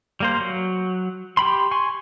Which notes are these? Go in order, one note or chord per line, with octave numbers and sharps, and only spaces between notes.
G3 A#3 C5
F#3
G4 G5 B5 C6
G#5 C6 C#6